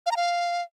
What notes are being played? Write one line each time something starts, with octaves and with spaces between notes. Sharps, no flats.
F5
A#5
F5